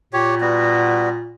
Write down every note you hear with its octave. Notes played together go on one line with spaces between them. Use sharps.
A#2 G4 C#5
G3 B3 F#4